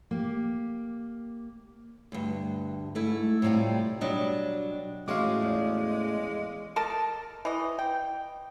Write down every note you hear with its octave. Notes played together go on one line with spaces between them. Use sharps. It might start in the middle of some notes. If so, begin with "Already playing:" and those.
A#3 G4
D2 G2
G#2 A3 E4
A2 C3 G3 C4 F4
B2 F#3 G3 D4 D#5
A2 G#3 A3 C#4 F#4 F5 C#6 D6
E2
A4 A#4 D#5 A5
E3 D#5
G5